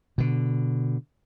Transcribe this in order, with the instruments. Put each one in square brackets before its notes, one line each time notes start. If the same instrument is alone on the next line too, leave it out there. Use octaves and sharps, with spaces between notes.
[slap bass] B2 D3